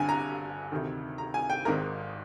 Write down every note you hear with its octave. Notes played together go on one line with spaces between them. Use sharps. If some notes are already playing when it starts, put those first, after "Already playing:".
Already playing: G1 G2 D3 G#5
A#5
D2 C3 D#3
A#5
G#5
G5
G#1 G#2 D#3 A#4